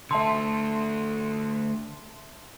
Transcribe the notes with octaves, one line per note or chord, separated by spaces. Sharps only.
D3 A3 E5 A5 C6